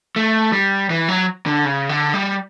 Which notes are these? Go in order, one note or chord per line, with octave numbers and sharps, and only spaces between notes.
A3
G3
E3
F#3
D3
C#3
D3
G3